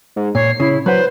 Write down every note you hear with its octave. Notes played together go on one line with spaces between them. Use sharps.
G#2
A#2 C#5 C7
C#3 E4
F#3 B4 C5 F#5